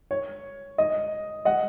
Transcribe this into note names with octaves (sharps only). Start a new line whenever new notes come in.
C#5
D#5
D#5 F#5